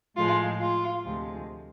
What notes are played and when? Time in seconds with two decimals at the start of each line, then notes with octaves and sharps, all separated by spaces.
0.16 A2 F3 G#3 F4
0.60 F4
1.05 D2 C3 F3 G#3